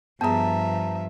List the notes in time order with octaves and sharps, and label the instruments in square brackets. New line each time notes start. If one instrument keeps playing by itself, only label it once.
[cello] G2 F3 [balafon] B3 G#4 [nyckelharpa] E5 [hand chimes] A5 A#5